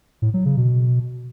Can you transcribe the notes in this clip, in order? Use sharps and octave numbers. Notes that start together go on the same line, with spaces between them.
A2
F#3
C#3
B2